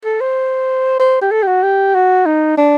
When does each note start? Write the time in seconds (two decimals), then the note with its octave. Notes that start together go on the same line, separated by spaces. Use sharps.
0.05 A4
0.21 C5
1.00 C5
1.21 G4
1.31 A4
1.43 G4
1.47 F#4
1.63 G4
1.94 F#4
2.26 D#4
2.57 D4